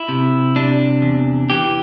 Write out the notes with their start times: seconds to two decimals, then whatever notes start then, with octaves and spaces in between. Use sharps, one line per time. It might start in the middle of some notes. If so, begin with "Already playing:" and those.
Already playing: E4
0.09 C3
0.56 C3 D4
1.02 E2
1.50 E3 G4